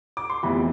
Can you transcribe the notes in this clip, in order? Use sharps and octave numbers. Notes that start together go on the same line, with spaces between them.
D6
C6
F1 E2 C3 E3 B5